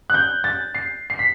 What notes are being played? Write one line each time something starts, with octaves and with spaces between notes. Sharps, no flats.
F#6
G6
A6
C7
C7
B6